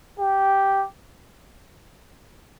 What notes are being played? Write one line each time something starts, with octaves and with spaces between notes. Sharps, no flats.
G4